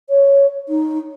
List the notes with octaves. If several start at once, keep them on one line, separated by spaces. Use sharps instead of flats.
C#5
D#4